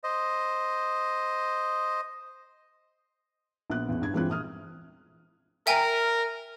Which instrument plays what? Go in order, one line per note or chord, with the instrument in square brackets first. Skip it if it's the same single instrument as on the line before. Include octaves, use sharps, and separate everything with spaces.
[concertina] C5 D#5
[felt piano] A#1 B3 F#6
A1 E2
G2 G#6
G2 E3 G#3 C4 F4 F#6
A#1 D#6 F6
[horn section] A#4 [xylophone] E5 G5 G#5